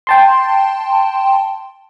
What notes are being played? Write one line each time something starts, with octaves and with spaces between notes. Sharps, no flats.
G5 A5 C6